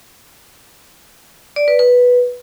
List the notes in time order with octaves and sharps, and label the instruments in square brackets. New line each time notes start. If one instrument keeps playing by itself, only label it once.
[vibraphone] D5
B4
B4